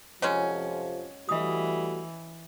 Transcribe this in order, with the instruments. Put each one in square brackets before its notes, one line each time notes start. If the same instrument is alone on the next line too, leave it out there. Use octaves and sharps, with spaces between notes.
[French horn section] F2 C3 F3 [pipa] F#3 G#3 C#4 [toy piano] C#5
[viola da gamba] E3 [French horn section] G3 A3 F#4 [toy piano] D#5 D#6